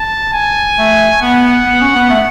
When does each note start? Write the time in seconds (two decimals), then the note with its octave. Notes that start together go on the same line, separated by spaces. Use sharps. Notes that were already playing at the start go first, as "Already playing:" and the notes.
Already playing: A5
0.34 G#5
0.78 A3
1.22 B3 F#5
1.66 B3
1.81 C#4
1.96 B3
2.10 A3